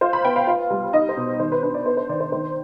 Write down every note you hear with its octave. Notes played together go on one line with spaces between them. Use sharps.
F4 C5
B5
B3 G5
F5
F4
G3
D#4 D#5
C5
B2
D#3 C5
B4
D4 B4
D5
B3 C5
C5
D#3 D5
C5
D#3 C5